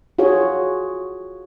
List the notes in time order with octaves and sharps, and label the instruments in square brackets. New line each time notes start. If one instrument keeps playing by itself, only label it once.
[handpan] F4 F#4 G#4 C#5